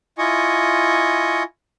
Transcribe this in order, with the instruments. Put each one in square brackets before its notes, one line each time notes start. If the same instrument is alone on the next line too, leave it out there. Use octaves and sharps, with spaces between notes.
[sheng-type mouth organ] E4 F4 D#5 G#5 C#6